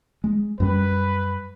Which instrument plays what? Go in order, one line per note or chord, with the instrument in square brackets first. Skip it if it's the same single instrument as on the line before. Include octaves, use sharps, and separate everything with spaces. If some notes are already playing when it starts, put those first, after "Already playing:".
[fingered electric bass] G#3
[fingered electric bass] F#2 G3 [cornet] B4